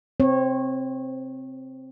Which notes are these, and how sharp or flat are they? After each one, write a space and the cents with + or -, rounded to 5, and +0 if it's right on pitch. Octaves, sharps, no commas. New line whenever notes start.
C4 +0 C#5 -25